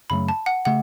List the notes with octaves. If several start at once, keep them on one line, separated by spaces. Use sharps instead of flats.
F#2 C#3 F#3 A3 B5
A5
F#5
C#3 A3 F#5